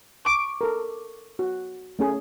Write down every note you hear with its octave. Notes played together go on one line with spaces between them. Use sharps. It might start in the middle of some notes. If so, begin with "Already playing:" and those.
C#6 D6
A4 A#4
F#4
A3 C#4 G#4